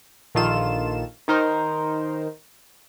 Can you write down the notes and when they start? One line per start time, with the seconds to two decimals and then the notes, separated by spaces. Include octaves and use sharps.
0.35 A#1 D3 D#3 F4 A4 E7
1.28 D#3 D#4 A#4 C5